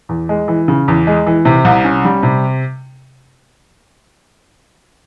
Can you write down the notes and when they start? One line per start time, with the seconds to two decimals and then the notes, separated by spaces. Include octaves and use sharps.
0.09 E2
0.29 G#3
0.48 E3
0.68 C#3
0.88 E2
1.07 G#3
1.27 E3
1.45 C3
1.65 C2
1.84 C#4
2.05 G3
2.23 C3